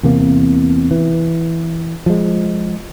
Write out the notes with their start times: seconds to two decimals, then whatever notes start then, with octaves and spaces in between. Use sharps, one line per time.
0.03 E2 C3 A#3
0.91 E3
2.06 F3 G#3